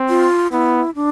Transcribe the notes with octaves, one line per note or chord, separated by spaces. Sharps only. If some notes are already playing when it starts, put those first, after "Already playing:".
Already playing: C4
F4
B3 E4
D4